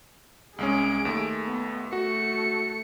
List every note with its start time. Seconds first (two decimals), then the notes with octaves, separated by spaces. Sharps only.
0.58 C2 G#3 C#4 G#4 D7
1.05 D#2 A3
1.45 B3
1.93 A3 F#4 C#7